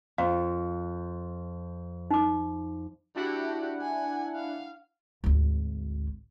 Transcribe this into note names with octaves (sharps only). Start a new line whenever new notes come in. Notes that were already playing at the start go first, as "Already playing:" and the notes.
F2 F5
D#4 D6
D4 E4 F#4 G4 F#5
G#5
F5
G#1 D2